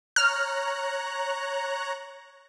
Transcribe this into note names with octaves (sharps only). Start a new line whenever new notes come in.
C#5 A#5 F6 F#6